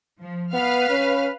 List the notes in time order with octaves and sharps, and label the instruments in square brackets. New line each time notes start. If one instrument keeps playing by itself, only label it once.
[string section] F3
[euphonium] B3 [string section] B4 F5 F6
[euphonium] C#4